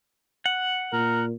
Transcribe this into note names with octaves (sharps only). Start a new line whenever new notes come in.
F#5
A#2 A#4